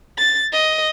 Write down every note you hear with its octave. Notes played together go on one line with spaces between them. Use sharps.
A6
D#5